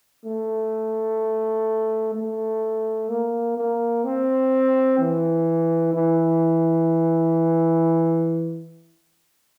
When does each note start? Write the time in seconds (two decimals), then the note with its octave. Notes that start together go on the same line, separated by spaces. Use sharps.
0.25 A3
2.14 A3
3.09 A#3
3.57 A#3
4.04 C4
4.99 E3
5.94 E3